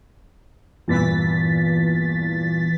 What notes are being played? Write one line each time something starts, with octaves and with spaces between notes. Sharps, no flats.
E2 G2 A#2 E3 A6 B6